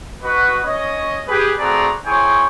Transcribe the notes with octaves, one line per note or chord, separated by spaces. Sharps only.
F#4 B4 D#5
C#4 C#5 D#5
G4 G#4 B4
A3 C4 F#4 G#4 D5 A#5
E4 G#4 C5 C#5 G5 G#5